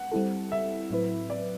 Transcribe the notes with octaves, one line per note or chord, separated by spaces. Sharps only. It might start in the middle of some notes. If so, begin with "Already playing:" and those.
Already playing: F#5
G3 C4 E4 A4
E5
A2 F#3 C4 E4 B4
D5